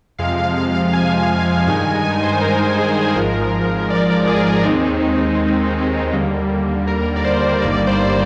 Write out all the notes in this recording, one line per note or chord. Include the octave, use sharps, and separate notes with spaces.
F2 C3 F3 G#3 F5
F5
F5
F5
G#5
G2 D#3 G#3 D#4 G#5
G#5
C5
A#4
A#4
G#4
G#1 G#2 F3 G#3 A#4
D5
G#4
A#4
D#2 D#3 G#3 C4 D#4
D#2 D3 G3 A#3
A#4
D5
C5
G1 G2 D#3 G3 A#3 D5
C5